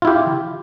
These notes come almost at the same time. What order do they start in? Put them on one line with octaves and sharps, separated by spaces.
F4 E4 G4